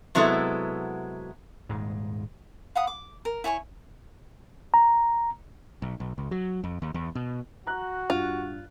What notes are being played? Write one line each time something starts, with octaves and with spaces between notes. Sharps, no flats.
C3 F#3 G#3 B3 E4 A4
D#1 G#2 G#3
F5 F#5 B5 D#6
D6
A#4
E4 C#5 G#5 C#6
A#5
B1
B1
C#2
F#3
F2
D#2
E2
B2
F#4 A#5 F#6
G2 F4